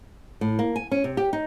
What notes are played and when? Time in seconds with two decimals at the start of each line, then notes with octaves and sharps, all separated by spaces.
0.41 A2
0.59 A#3
0.76 G#5
0.91 C#4
1.04 C3
1.17 G4
1.33 D#4